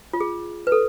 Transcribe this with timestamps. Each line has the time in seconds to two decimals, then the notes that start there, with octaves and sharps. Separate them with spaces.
0.13 F4
0.20 G#4
0.67 B4
0.72 A4